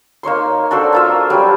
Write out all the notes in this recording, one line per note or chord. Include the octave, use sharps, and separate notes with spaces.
A#3 D#4 C#5 C6
D4 F#4 A4 C5
A#3 F4 E5
F#3 G3 D4